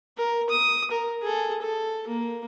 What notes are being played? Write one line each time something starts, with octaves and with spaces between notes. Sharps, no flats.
A#4
D#6
A#4
G#4 A4
A4
A#3